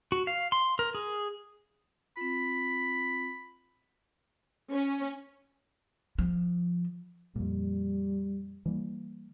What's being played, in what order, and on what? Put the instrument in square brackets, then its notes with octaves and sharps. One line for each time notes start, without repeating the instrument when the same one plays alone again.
[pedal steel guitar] F#4
F5
C6
A#4
G#4
[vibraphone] C4 F4 [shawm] B5
[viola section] C#4
[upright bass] F3
[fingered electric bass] F2 A#2 [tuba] G3
[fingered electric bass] E3 G3 A#3